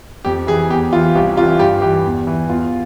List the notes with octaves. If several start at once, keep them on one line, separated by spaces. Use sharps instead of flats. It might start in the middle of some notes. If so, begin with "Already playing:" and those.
F2 G4
E3 G#4
E2 G4
E3 F4
C2 G4
C3 E3 F4
G2 G4
E3 G4
E2
E3
E2 F4